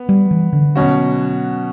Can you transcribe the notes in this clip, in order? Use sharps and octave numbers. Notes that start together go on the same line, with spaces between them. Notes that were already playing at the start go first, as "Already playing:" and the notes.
Already playing: B3
G3
E3
D3
B2 F#3 C#4 F#4